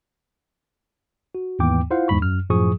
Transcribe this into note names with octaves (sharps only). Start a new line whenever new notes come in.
F#4
D#2 G#2 E3 B3 G5 D6
E4 F4 C5 F5 F#5
E2 G#2 B5 C#6
F#2 F6
F#2 A2 F3 G#4 C#6 D#6